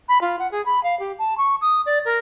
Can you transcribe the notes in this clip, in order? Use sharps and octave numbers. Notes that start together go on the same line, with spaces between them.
B5
F4
F#5
G#4
B5
F5
G4
A5
C#6
D#6
D5
A#4